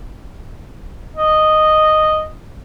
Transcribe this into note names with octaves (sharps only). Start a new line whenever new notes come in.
D#5